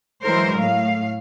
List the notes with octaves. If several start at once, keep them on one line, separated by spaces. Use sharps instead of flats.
E3 F#3 G#3 E4 A#4 C5
A2 F5